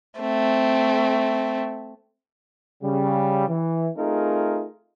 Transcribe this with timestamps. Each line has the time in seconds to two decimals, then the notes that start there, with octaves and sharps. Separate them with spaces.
0.21 A3 C4
2.83 C#3 G3
3.49 E3
3.97 A3 C4 D#4 F4 G#4 A#4